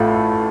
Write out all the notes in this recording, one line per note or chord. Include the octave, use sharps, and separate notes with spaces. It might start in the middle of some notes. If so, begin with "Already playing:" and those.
Already playing: A1 A2 A3 F4 A4